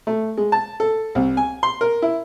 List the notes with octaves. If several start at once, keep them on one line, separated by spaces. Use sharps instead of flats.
A3
G#3
A5
A4
C2
G#5
C6
A#4
E4